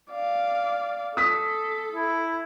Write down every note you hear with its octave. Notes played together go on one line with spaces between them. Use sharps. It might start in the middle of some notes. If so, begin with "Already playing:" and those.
D5 F5
A4 D#6 B6
E4